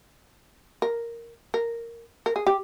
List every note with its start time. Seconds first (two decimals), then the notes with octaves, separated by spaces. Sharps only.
0.82 A#4
1.54 A#4
2.26 A#4
2.36 G#4
2.47 G4